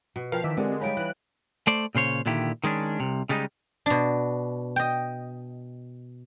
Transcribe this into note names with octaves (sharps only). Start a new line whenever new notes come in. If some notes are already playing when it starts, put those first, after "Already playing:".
B2
F3 A#4 B4 F5 G5
D#3 E3 D6 E6 B6
D3 G#3 C4 G4 A#4 D5
G3 D#4 C#5 F5 B5 D7
E3 F#6
A3 C5 D5
A#2 C#3 C5 C#5
A#2 D3 D#3 E4 G4
D#3 G#3 C#4 D4
C2 C3
C#3 G3 G#3 D4 D#4
B2 D4
D#5 G5